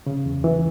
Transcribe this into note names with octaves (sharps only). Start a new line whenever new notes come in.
C#3
E2
E3